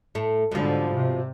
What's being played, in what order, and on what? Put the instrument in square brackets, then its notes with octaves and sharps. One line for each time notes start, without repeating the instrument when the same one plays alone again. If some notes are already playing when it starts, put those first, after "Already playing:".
[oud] A2 A3
[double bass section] G#2 D3 G3 [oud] B2 F3
[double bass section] C3